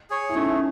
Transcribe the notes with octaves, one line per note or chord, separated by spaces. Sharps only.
G#4 C#5
E4
A3 C#4 D#4